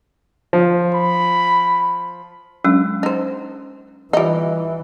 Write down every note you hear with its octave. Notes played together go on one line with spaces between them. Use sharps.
F3
B5
F#3 G#3 C#4 D4
D#4 C5
E3 G3 D#4 F4 E5